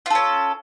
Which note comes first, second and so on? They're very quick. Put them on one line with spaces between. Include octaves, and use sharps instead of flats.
F4 A4 C#4